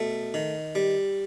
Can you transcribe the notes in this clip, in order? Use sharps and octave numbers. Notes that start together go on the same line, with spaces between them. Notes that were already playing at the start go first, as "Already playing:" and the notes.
Already playing: B2 A3
D#3
G3